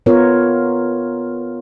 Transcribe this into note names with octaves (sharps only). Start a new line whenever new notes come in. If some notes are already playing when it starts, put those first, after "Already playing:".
B3 F4 A#4 C#5